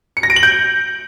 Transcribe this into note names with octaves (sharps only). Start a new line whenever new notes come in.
C#7
A#6
D7
F#7
G6